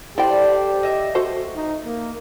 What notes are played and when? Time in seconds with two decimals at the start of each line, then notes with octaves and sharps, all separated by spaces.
0.18 E4 G4 A4 C5 D5 G5
0.83 D#5 E5
1.15 F#4 A4 C5
1.56 D#4
1.86 A#3